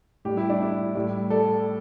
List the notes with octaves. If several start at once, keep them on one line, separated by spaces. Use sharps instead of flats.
A2 G3 G4
E4
D4
E4
A2 G3
A4 D5